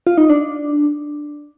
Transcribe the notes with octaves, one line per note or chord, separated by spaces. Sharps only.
F4
D#4
D4